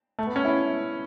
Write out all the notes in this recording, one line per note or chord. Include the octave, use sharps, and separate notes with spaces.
A3
B3
C#4
E4